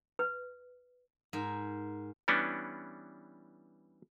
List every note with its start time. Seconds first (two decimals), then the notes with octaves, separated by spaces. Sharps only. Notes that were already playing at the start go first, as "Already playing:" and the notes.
0.19 B4
1.33 G#2 A#4 G#5
2.28 E3 G3 B3 C#4 D4